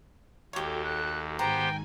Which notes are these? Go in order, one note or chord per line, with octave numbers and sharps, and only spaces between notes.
D#2 F#4 G4 A4 C#5
F#6
G#2 D#3 B3 G4 C5 G5 G#5 A#5